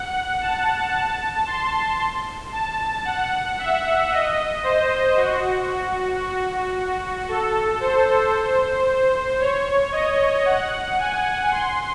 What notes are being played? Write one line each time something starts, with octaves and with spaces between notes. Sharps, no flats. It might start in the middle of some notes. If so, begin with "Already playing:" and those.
Already playing: F#5
A5
A5
C6
A5
F#5
E5
D#5
C5
F#4
F#4
A4
C5
C#5
D#5
F#5
G#5
C6